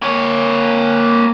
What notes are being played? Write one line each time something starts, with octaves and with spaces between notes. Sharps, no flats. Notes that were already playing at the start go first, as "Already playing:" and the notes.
A#3 C#5